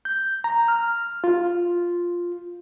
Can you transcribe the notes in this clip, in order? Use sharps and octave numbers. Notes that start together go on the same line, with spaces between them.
G6
A#5
F6
F4